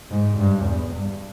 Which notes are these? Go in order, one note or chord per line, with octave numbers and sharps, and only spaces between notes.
G#2
G2
E2
G2